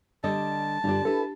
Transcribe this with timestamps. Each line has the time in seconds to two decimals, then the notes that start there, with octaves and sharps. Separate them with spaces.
0.24 D3 G3 D#5 A5
0.84 G2 D3 D4 F4 G4
1.05 D4 E4 G4 A4 B4